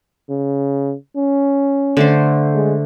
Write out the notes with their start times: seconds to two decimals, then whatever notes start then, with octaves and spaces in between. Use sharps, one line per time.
0.30 C#3
1.17 C#4
1.97 D3 A3 C5
2.54 G#3